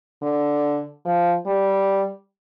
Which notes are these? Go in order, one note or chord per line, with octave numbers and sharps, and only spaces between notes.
D3
F3
G3